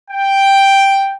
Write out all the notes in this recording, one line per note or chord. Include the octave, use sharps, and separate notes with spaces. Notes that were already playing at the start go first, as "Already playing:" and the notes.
G5